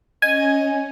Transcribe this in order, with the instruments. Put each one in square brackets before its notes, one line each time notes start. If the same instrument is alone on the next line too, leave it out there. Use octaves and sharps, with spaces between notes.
[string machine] C#4 [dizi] D#5 [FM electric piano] G#5